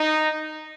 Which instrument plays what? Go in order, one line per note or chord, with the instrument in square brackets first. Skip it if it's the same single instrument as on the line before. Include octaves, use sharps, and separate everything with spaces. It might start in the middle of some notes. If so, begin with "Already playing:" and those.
Already playing: [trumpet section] D#4